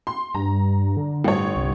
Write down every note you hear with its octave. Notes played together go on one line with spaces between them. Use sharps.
C6
G2 A#5
D3
G1 A2 C#5
C2